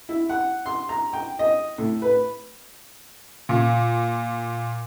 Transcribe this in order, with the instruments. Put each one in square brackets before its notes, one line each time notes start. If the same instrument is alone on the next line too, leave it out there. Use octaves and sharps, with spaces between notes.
[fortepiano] E4
F#5
C6
A#5
G5
D#5
A2
B4
[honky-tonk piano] A#2